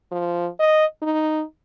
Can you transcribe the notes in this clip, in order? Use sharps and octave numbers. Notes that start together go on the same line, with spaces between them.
F3
D#5
D#4